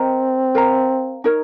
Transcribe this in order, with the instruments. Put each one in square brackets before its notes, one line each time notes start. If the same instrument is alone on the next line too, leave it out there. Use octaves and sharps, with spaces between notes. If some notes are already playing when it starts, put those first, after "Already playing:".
Already playing: [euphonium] C4 [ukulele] A#4 D#5 G5 A#5
[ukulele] A#4 F5 A#5
D#4 A#4 C#5